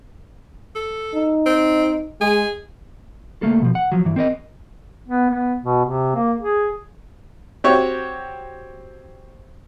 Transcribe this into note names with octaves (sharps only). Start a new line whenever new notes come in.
A4
D#4
C4
G#3 G#4
C#2 A3 A#3 A4
B2 F3
F#5
F3 F#3
G2 E3
C4 A#4 D5 D#5
B3
B3
B2
C3
A#3
G#4
C4 F#4 G4 C#5